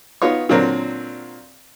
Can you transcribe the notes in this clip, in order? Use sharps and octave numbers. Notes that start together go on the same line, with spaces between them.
B3 D#4 F4 C#5
A#2 D3 F#3 C4 A#4